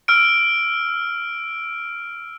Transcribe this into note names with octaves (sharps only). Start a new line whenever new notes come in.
E6 F6 D7